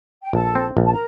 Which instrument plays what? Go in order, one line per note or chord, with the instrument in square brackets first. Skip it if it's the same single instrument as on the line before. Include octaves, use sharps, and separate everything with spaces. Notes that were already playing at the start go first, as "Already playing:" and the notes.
[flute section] G5
[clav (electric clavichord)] A#1 [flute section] A4 A5
[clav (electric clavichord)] C4
A#1
[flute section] A5
A#4 A#5